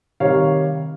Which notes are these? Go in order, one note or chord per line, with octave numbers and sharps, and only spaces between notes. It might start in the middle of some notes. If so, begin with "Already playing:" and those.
C3 D#3 G3 C#5 F5